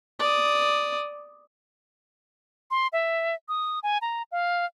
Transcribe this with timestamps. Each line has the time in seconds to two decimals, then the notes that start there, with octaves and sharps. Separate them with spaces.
0.20 D5 D#6
2.71 C6
2.93 E5
3.49 D#6
3.83 G#5
4.02 A#5
4.32 F5